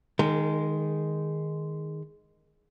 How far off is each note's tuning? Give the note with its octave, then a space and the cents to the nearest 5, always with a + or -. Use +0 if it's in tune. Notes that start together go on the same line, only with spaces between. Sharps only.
D#3 +0 G#3 +0 A#4 -40